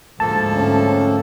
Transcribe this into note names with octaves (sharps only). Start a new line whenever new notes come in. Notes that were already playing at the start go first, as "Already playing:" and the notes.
D2 G#2 F3 A#3 A4 A5
A3 C4 C#4